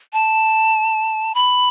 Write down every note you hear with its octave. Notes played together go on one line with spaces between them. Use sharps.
A5
B5